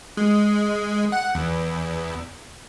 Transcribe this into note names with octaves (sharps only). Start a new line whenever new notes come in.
G#3
F#5
E2